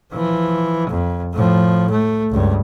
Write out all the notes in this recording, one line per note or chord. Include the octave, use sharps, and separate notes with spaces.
E3 F3
F2
A2 F3
A3
C#2 G2